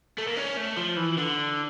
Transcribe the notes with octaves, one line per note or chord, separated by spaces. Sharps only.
A3
A#3
C#4
A3
F3
E3
D3